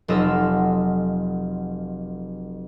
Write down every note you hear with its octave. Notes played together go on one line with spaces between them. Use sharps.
F1 F#3 F4 A4 D#5 E6